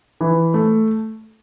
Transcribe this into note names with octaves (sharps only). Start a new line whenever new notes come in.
E3
A3